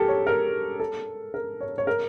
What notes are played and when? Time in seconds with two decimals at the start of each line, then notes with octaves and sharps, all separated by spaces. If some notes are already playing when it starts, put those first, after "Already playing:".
Already playing: G4 A4 A#4
0.08 C#5
0.27 A#4
0.80 A4
1.34 A#4
1.61 C#5
1.78 C#5
1.87 A#4